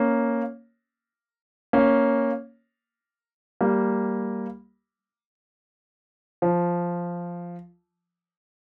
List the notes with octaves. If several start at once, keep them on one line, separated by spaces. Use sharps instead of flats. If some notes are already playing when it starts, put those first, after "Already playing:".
Already playing: A#3 C#4
A#3 C#4
G3 A#3
F3